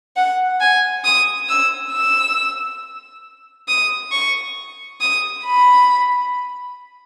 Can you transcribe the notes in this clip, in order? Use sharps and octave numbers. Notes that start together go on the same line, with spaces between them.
F#5
G#5
D#6
E6
E6
D#6
C#6
D#6
B5